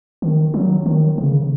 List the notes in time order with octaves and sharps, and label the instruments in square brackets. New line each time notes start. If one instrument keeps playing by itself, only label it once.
[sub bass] D#3
F#3
D#3
C#3